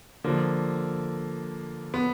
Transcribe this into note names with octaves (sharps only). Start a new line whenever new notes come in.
D3 F3 A#3
B3